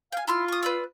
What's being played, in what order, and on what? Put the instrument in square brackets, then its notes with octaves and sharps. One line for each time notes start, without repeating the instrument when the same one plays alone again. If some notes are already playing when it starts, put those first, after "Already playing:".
[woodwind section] F5 [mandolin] G5 G#5
[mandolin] E4 C6 F6 [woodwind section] F4
[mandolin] C#6 D#6
B4 D5 E6